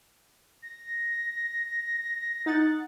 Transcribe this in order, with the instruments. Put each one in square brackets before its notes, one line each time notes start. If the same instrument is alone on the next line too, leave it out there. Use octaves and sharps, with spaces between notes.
[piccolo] A#6
[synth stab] D#4 A6 [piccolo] F#5